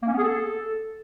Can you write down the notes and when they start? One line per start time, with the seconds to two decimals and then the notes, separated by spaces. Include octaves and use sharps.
0.02 A#3
0.07 C#4
0.13 B3
0.18 G#4
0.23 A4